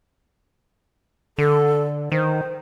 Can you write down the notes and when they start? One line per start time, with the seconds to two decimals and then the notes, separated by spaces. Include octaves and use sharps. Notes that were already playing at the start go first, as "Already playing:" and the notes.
1.38 D3 A4
2.12 D#3 C5